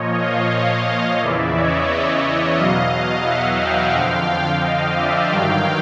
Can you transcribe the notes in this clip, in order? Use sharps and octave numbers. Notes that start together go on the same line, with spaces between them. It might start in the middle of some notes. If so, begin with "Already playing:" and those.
Already playing: A#2 F3 C#5 D#5
D#5 F5
E2 C#3 E3 D5 E5
C#5 D#5
C#5 D#5
E2 B2 F#3 D#5 F5
E5 F#5
F5 G5
F2 D3 F3
D#5 F5
D5 E5
G2 D#3 F#3 F5 G5